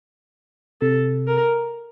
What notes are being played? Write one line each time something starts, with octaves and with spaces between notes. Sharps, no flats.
C3 A4
A#4